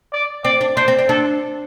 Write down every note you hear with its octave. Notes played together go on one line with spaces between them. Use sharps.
D5
C4 D5
D4
D4 C5
C4
D4
D4 A4